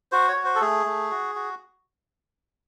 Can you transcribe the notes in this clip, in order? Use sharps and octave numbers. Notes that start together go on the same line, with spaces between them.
F#4 C5
C#5
F#4
C5
A4
A3 G#4
A3
F#4
F#4